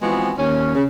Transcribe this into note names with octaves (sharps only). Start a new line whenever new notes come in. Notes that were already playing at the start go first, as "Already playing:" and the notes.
E3 F3 G#3 B3 C4 F#4
D#2 C#4
C#3